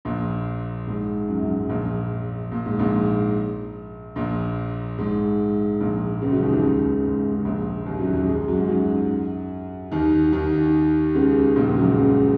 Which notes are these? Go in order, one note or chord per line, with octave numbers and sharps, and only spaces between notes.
A#1 A#2
G#2
F#2
F#2
G#2
A#1 A#2
A#2
G#2
A#1 A#2
A#1 A#2
G#2
A#1 A#2
C#2 C#3
F#2 F#3
D#2 D#3
D#2 D#3
C#2 C#3
G#2
C#3
A#1 A#2
D#2 D#3
F#2 F#3
F#2 F#3
G#2 G#3
F#2 F#3
G#2 G#3
F#2 F#3
D#2 D#3
D#2 D#3
C#2 C#3
A#1 A#2
C#2 C#3
F#2 F#3
F#2 F#3
C#2 C#3